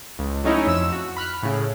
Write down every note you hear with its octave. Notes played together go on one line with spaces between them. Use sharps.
C#2
F#3 A3 C#4 D#4 E4 C#5
F2 E6 E7
F#4
B5 F6 F#6 B6
A2 C#3